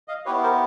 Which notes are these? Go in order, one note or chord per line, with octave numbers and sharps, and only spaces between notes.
D#5 F5
B3 E4 G4 B4 C#5
A#4 C5